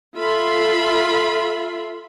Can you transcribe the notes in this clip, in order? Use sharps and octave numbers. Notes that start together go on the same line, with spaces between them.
F4 A4 E5 B5 C6